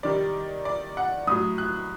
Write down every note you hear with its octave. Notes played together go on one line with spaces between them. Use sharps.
C3 D#3 G3 D5
D5
F#5
A2 F#3 D#6
F#6